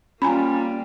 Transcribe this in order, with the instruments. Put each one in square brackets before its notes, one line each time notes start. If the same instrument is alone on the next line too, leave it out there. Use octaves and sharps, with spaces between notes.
[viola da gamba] G3 A#3 [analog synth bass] C#4 [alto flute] F4 [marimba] G#5 A#5 B5